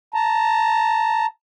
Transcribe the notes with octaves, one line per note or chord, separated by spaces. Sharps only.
A5 A#5